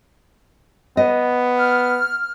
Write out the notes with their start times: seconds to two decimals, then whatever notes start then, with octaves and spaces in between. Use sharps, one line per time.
0.97 B3 D#5
1.57 F6